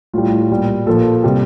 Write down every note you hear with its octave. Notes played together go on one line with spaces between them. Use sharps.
A2 G3 F4
A#2 G3
A#2 F3 A4
C3 G3